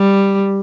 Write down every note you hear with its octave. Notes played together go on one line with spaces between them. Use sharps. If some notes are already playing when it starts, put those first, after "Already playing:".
Already playing: G3